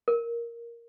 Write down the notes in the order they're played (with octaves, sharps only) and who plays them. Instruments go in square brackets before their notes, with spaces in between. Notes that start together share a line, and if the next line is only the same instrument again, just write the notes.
[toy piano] A#4